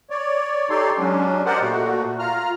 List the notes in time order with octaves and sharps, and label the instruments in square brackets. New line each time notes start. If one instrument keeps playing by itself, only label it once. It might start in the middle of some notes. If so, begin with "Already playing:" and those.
[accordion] C#5 D5
D#4 G4 A4 C#5 D5 C6
F#3 G#3 C#4 D4
G4 A#4 C5 D5 D#5 F#5
A#2 A3 F#4
F4 A#5 F6